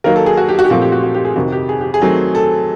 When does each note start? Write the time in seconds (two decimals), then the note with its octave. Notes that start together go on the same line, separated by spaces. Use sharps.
0.04 D#3 F#3 A#3 A#4
0.16 A4
0.26 G#4
0.37 F#4
0.49 G4
0.59 F#4
0.65 G4
0.70 A#2 F3 A3 C4 F#4
0.82 G4
0.92 F#4
1.03 F#4
1.14 G4
1.25 G#4
1.36 F2 C3 D#3 F#4
1.52 G4
1.69 G#4
1.81 G4
1.94 G#4
2.02 D#3 F#3 A3 C4
2.35 A4